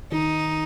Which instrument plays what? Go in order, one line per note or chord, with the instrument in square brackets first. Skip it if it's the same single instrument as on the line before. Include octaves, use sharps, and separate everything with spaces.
[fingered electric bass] D#3 [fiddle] D#4